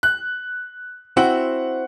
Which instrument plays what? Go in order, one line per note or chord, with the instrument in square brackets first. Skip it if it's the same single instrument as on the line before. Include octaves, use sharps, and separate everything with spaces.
[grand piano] F#6
[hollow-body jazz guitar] C4 E4 F#4 [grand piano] F#5